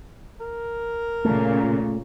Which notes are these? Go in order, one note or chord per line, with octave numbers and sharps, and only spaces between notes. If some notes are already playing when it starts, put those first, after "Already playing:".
A#4
A#2 C#3 A3